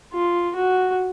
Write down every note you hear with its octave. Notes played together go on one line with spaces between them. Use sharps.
F4
F#4